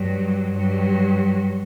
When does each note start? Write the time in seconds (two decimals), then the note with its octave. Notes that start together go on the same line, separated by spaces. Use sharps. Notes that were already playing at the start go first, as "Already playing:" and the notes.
Already playing: G2 F#3
0.51 G2 F#3